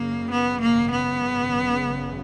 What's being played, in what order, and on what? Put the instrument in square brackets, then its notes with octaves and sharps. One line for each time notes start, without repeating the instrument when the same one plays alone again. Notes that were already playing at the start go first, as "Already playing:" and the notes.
Already playing: [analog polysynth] F#2 C#3 [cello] A#3
[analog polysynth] G#1
[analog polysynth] C#3 [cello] B3
[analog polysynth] G#1
[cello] A#3
[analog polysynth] G#1
[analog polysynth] G#1 [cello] B3
[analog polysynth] C#3
G#1
F#2
C#3
G#1